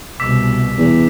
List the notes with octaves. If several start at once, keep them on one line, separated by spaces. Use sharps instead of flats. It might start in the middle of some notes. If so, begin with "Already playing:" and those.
C2 B2 D6 E6 B6
E2